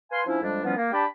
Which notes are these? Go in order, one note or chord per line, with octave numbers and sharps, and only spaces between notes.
B4 F5 G#5 C6
F3 C#4 D4 E4
F2 G3 G#3 D4
E3 F3 G3 B3 C#4 F4
A#3
D4 G4 G5 A5 B5